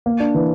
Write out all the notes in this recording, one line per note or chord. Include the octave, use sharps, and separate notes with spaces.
A#3
D4
E3